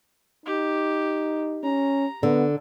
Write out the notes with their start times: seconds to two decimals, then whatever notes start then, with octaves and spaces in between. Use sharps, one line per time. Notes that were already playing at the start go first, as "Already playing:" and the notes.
0.46 D#4 G4
1.64 C#4 A#5
2.23 D3 B3